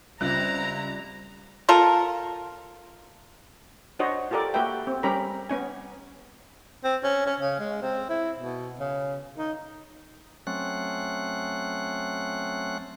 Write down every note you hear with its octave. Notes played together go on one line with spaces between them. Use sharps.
C#2 G3 C4 E4 F4 A#5 F#6
F4 A4 A#4
D4 F#4 C5 C#5 D#5
F4 G4 A4 A#4 D5
A#3 F#4 G4 B4 E5 G5
C4
G3 C#4 G4 A#4 A#5 B5
B3 C#4 G#5
C4
C#4
C#4
C#3
G#3
C4
E4
B2
C#3
D#4
F#3 A3 C4 C#4 F#6